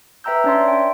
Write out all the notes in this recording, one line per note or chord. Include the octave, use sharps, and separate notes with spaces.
B4 E5 G5 A#5 E6 G6
C#4 D4 C#5 D5 E5 C6
G5